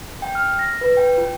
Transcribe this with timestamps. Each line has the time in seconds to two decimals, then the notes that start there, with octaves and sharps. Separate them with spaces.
0.22 G5
0.35 F6
0.59 A#6
0.81 B4
0.97 G5
1.18 F4